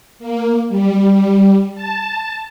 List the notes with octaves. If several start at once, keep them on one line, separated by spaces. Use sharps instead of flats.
A#3
G3
A5